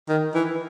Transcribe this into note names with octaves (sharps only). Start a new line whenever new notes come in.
D#3
E3